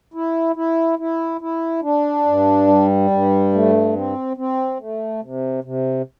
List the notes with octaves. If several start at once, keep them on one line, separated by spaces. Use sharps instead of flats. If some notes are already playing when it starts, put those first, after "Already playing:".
E4
E4
E4
E4
D4
G2
G3
G2
A3
C4
C4
A3
C3
C3